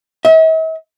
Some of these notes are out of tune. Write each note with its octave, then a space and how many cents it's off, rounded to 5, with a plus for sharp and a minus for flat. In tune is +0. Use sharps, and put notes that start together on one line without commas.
E5 -45